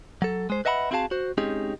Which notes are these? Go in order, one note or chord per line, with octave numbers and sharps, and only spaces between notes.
F#3 A4
G#3 C5
B4 D#5 E5 F#5 A5 B5
C4 E4 F#4 G#4 F5 A5
F#4 C5
G#3 C4 C#4 D#4 G4 G#4